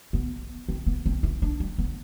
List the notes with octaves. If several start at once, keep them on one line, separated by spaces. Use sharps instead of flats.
B3
C4
B3
C4
E4
D4
G3
B3